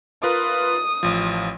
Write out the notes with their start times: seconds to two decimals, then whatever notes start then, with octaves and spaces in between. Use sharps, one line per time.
0.23 F4 A#4 B4 D#6
1.03 A1 F3